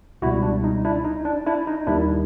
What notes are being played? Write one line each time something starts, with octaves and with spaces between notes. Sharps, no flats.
C#2 B2 G3 E4 F#4
D4
D#4
D4 E4
D#4
D4
D4 E4
D#4
D#2 D#3 G3 D4 E4